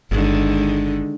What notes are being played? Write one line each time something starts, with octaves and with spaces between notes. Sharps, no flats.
G1 D3 D#3 G#3